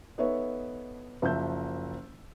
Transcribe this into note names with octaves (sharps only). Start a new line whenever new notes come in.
B3 D#4 A4 B4 C#5 E5
F#1 F3 E5 E6 G6